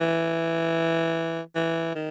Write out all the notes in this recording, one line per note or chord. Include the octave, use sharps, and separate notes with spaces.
E3
E3
D#3